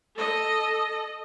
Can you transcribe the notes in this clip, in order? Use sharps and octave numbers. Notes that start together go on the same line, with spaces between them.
A4 D#5